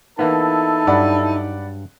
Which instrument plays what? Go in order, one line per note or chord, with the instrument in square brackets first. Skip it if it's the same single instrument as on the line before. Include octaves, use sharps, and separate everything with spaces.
[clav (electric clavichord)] E3 A#3 B3 [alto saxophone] D#4 [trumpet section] E4 A4 A5
[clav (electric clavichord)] G2 F#3 [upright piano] D5 F#5 B5